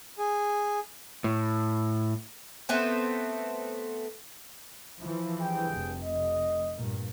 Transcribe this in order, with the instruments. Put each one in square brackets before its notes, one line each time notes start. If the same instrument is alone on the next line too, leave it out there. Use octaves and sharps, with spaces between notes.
[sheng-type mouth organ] G#4
[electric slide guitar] A2
[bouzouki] A3 B3 C4 C5
[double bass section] E3 F3
[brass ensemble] G2 G#4 G5
[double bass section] F1
[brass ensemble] D#5
[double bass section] G2 A#2